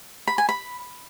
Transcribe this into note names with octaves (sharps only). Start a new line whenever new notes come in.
B5
G#5
B5